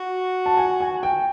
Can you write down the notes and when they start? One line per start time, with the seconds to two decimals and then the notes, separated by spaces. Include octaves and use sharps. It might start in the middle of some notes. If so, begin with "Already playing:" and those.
Already playing: F#4
0.46 A5
0.57 G#5
0.81 G#5
1.03 G5